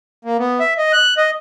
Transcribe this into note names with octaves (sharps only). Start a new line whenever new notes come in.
A#3
B3
E5
D#5
F#6
D#5